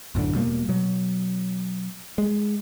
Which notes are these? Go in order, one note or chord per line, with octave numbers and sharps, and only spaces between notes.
B1 F#2 A2 D3
E1 B2 G3 A#3
B2 F#3
G#3